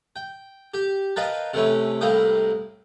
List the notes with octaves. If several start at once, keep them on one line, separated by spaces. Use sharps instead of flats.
G5
G4
A#4 B4 D#5 F5 G5 A5
C3 E3 A3 C#4
C2 A2 A#3 F5 G5 D#6